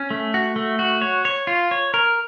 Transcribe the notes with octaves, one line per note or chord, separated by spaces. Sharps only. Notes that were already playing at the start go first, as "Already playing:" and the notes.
Already playing: C#4
A3
F#4
A3
F#4
C#5
C#5
F4
C#5
A#4